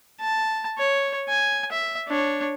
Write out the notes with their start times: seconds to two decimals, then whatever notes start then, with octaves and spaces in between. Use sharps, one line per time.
0.20 A5
0.78 C#5
1.29 G#5
1.72 E5
2.08 D4 C#5